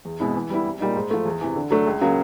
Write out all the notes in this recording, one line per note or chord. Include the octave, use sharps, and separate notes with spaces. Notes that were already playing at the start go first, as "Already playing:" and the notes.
E2
B2 G#3 C4 E4
E3
G3 B3 E4
C2
A#2 G3 A#3 D#4
G#2
F3 A3
E2
C3 E3
D3
F#3 A3 D4
C#2
C#3 F#3 A#3